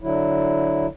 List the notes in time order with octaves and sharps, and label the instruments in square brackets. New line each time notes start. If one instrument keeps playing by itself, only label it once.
[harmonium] D3 F#3 E4